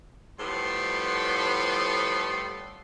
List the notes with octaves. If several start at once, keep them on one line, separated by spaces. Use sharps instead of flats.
A2 F3 G3 B3 A4 C6